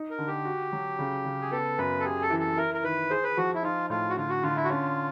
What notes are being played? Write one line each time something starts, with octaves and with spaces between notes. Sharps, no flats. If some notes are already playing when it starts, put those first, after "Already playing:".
Already playing: D#4
A#4
D3
G4
F#4
F#3
C#3
C#3
G#4
B3 A4
F#2 B4
A4
G4 G#4
A4
E3
A4
E4 A#4
A#4
D#3 B4
G#4 C5
B4
F3 F#4
E4
D#4 F4
A2 F4
F#4
D3 F4
F#4
D3 F4
E4
F#4
C#4 F4